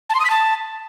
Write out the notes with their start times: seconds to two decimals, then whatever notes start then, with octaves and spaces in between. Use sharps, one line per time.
0.10 A5
0.15 C6
0.20 D#6
0.25 B6
0.30 A5